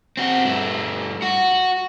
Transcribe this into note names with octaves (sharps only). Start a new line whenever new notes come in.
C4 F#4
G2 A3
F#4